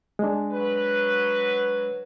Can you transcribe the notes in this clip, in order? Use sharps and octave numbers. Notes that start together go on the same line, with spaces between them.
G#3 D4
F#3 B4